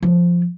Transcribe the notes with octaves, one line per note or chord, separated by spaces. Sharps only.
F3